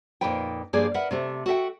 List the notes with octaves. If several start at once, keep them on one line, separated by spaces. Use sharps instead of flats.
F2 A#2 D#4 A#4 B4 G5
G2 F3 G3 A#3 G#4 D5
A#4 B4 D#5 E5 F#5
C3 A3 G4
F#4 A4 E5 G5